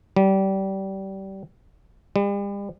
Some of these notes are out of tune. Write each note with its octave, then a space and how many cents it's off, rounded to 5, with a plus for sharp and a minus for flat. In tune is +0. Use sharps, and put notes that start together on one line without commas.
G3 -25
G3 +40